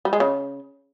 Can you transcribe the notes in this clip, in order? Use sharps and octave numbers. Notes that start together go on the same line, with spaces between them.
G3
G#3
C#3